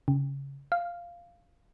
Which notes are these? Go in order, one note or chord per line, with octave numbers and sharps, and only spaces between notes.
C#3
F5